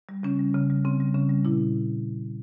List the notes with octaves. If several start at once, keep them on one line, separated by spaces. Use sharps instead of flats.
G3
C#3 C#4
G3
C#3
G3
C#3 C4
G3
C#3 C#4
G3
A#2 E4